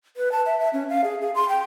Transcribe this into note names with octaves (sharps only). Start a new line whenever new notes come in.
B4
A5
E5
E5
C#4
F5
G#4
G#4
C6
G5